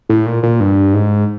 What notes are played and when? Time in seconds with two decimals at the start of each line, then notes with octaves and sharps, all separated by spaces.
0.09 A2
0.26 A#2
0.43 A#2
0.60 G2
0.94 G#2